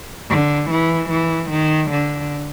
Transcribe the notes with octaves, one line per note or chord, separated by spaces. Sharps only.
D3
E3
E3
D#3
D3